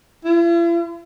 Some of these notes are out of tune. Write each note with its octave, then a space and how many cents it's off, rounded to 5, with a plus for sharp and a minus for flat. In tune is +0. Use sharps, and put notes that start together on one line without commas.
E4 +45